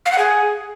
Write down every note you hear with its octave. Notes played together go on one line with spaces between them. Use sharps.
F5
F#5
G#4